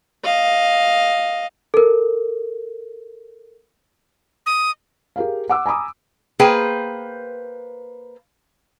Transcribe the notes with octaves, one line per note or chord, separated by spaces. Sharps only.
D#5 F5
A4 A#4
D#6
G4 G#4 A#4 F5
F#5 D6 E6
G#5 A#5 B5 D6 D#6
A#3 G#4 B4 C5 G5